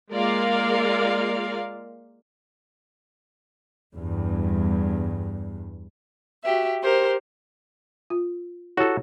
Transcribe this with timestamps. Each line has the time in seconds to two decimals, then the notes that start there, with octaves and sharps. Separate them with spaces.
0.13 G#3 A#3 F4 A#4 D5 F5
3.95 E2 G2
6.43 F#4 G4 E5
6.82 G4 A#4 C5
8.10 F4
8.77 E4 F#4 G4 A4 C#5